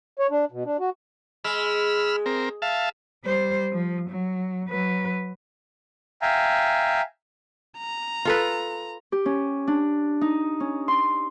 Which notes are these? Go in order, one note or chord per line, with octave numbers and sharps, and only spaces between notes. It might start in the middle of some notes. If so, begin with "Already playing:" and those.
C#5
D4
B2
D4
F#4
G#3 B5 E6 F6
C4 A#4
E5 F5 A5
G3 C5
F3
F#3
F#3 B4
E5 F5 G5 G#5 A#5
A#5
F4 A4 B4
G4
C#4
D4
D#4
C#4
C6